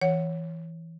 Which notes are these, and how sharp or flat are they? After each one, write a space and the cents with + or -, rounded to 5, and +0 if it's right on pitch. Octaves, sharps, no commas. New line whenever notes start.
E3 +0 C#5 +0 F#5 +0